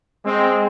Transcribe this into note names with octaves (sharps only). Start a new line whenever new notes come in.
G#3 C4